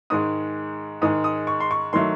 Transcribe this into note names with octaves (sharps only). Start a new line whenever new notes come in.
G#2 D#3 G#3 D#6
G#2 D#3 G#3 D#6
D#6
C#6
C6
C#6
D#3 F#3 A3 C6